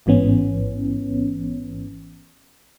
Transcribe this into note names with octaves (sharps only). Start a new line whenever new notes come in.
A1 G#2 E3 B3 C#4